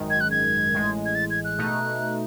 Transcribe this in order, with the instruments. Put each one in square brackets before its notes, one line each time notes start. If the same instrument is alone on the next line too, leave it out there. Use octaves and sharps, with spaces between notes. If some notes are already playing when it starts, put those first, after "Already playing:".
Already playing: [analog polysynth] G#1 F#2 D#3 G#3
[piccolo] G#6
F#6
G#6
[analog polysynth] A1 A2 G#3
[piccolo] G#6
A6
G#6
F#6
[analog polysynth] B2 A3 D#4